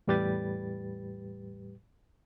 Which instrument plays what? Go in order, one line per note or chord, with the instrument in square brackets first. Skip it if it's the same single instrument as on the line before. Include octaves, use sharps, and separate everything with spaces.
[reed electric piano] E2 A2 G3 G4 B4 A6